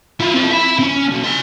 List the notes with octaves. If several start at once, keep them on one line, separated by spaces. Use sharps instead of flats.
E4 F4
C4 F4
E5 B5
C4 C#4
B1
F4 G#5